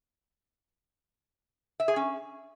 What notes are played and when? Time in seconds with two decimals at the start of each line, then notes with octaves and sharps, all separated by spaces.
1.80 E5
1.88 G#4
1.96 C#4